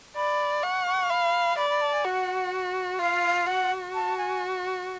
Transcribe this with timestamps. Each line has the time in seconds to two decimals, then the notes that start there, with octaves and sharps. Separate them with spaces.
0.16 D5 B5
0.63 F#5 C#6
0.87 C#6
1.10 F5 B5
1.57 D5 B5
1.70 B5
1.81 A5
1.93 G#5
2.04 F#4 F#5
2.99 F4 F5
3.47 F#4 F#5
3.94 A5
4.17 G#5